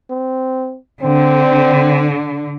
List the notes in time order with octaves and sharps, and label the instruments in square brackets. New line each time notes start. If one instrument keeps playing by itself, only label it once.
[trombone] C4
[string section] D3 [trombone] C4